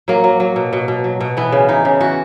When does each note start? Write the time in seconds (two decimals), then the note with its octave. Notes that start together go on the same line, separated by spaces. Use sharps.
0.08 F#3 A#3
0.24 F#3
0.40 F#3
0.56 B2
0.73 B2
0.88 B2
1.04 F#3
1.21 B2
1.37 E3 B3
1.52 C#3
1.69 E3 D#4
1.85 C#3
2.00 E3 F#4